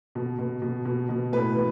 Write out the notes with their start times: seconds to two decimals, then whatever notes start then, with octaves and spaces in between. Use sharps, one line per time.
0.15 B2
0.39 B2
0.62 B2
0.85 B2
1.09 B2
1.32 A2 B4
1.56 E3